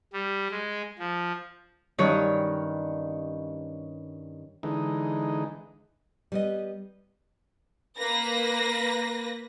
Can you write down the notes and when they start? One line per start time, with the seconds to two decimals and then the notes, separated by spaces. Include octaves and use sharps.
0.13 G3
0.51 G#3
0.99 F3
1.98 G2 D#3 C#4 C#5
4.63 D3 E3 G#3 D#4
6.32 G3 B3 D#5
7.96 A#3 B4 A#6